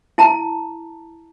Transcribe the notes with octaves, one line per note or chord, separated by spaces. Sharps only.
E4 A5 A#5